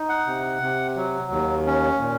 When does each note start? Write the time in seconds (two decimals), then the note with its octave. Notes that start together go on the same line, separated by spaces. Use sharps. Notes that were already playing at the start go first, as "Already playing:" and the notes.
Already playing: D#4
0.09 F#5
0.27 C3
0.62 C3
0.96 F#3
1.31 D#2
1.66 C#4
2.01 A#2